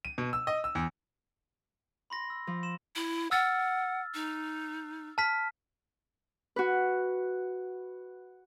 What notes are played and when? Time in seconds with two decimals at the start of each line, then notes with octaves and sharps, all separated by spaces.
0.05 D#7
0.18 B2
0.33 E6
0.47 D#5
0.64 E6
0.75 E2
2.10 B5 C6 A#6
2.30 E6
2.47 F3
2.63 C6 E7
2.96 E4
3.31 F#5 E6 F6 A6
4.14 D#4
5.18 A5 F6 B6
6.56 F#4 B4